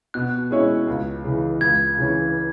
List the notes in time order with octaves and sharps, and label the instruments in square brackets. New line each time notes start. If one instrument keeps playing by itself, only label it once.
[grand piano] B2 [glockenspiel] F#6
[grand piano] G#3 C#4 E4 C#5
C#2
C#3 E3
[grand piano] C#2 [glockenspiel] G#6
[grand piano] C#3 E3 C#4